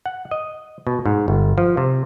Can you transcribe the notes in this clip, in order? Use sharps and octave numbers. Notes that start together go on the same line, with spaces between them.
F#5
D#5
B2
G#2
G1
F3
C3